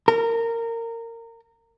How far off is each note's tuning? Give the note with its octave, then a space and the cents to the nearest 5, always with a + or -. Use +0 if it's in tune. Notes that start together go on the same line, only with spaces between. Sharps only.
A#4 -20